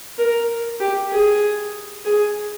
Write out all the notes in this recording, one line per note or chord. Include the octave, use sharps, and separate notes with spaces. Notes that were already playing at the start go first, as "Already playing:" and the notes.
A#4
G4
G#4
G#4